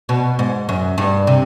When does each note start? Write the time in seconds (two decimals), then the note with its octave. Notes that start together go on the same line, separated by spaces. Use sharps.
0.09 B2
0.39 G#2
0.69 F#2
0.98 G2
1.27 C3